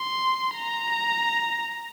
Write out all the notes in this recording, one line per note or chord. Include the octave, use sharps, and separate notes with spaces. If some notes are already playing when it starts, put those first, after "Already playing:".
Already playing: C6
A#5